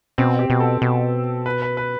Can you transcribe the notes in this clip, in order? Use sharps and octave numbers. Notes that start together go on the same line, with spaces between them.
B2 C4
G4
B2
A4
B2
B4
B4
B4